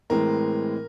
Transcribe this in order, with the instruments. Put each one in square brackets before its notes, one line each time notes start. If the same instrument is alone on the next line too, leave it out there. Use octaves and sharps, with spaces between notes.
[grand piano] A2 E3 G#3 C4 A#4